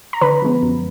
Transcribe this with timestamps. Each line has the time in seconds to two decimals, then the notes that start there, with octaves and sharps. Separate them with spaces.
0.13 A#5
0.21 D3 B4 B5
0.42 F3 G#3 B3
0.63 F#2